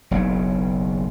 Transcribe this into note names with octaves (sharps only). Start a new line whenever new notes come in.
F#1 B1 C#3